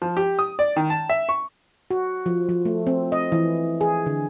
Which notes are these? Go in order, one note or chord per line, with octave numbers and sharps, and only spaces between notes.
F3
G4
D#6
D5
D#3
A5
E5
C#6
F#4
F3
F3
A3
C4
D#5
E3
G#4
D3